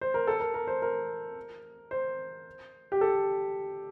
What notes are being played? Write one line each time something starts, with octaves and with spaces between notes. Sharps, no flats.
C5
A#4
A4
A#4
A#4
C5
A#4
C5
G4
A4